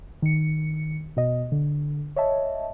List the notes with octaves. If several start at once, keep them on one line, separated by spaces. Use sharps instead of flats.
D#3 C#7
B2 D#5
D3
C#5 D#5 E5 A5